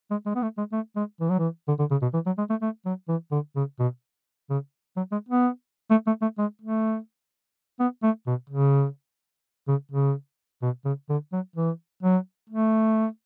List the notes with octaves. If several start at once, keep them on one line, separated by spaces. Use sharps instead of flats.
G#3
G#3
B3
A3
G#3
A3
G#3
E3
F#3
E3
D3
D3
C#3
B2
E3
F#3
G#3
A3
A3
F#3
E3
D3
C#3
B2
C#3
F#3
G#3
B3
A3
A3
A3
G#3
A3
B3
A3
B2
C#3
C#3
C#3
B2
C#3
D3
F#3
E3
F#3
A3